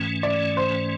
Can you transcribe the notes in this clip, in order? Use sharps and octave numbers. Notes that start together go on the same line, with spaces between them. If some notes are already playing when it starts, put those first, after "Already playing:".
Already playing: G#2 E3 A3 C#4
D5
C5